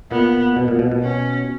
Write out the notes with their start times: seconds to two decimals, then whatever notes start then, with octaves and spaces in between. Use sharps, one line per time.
0.11 A#2 B3
0.56 B2
0.68 A#2
0.79 B2
0.92 B2
1.03 C#4